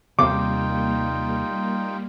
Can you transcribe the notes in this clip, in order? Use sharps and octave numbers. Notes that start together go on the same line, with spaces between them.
D#2 C3 G3 A#3 D#4 F4 G5 D6